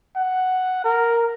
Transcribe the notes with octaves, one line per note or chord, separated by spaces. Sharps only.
F#5
A#4